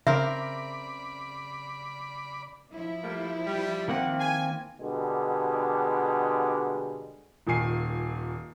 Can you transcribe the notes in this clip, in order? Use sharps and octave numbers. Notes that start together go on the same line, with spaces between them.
C#3 C4 A#4 D5 E5 B5
F3 E4
G3 A3 A#3
G3
D#3 A#3 C4 D#5 F#5
G#5
B2 D3 G3 G#3
D#1 A#2 D#3 G#5 C7